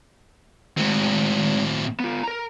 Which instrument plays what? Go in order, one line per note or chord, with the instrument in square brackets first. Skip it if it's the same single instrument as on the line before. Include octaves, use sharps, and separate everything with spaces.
[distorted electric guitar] A2 C4 [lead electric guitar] D#3 G#3
[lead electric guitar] B3 F4
A#4 A#5